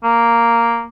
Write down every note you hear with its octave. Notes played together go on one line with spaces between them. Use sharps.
A#3